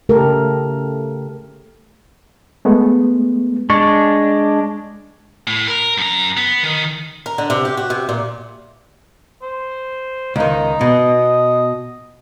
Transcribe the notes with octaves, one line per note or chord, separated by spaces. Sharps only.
C#3 A3 G4 A4 A#4
G#3 A3 B3
G#3 D4 C#6
A2
A#4
F#2 A#5
B3
D#3
A#4
D3
C3
G4
F#4
C3
A#2
C5
C#2 D#3 D#4
B2 D#5